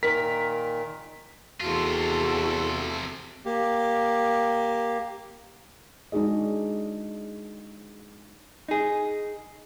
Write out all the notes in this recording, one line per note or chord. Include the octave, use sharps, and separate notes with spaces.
A#2 D#3 A#4 B6
E2 C3 F4 F#4 A4
A#3 G4
G#3 D4 D#4 F#4 G#4 D#5
D#4 G#4